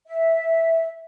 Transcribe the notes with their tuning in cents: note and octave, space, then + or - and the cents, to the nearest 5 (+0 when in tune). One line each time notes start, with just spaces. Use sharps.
E5 -5